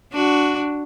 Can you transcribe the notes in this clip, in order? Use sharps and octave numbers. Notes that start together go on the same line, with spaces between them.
D4 F#4